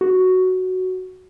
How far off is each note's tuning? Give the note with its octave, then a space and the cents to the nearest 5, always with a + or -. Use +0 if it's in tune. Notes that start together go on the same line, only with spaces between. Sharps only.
F#4 +5